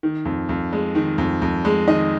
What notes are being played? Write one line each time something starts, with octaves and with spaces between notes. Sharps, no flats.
D#3
F2
F2
G#3
D#3
F2
F2
G#3
D#3 D#5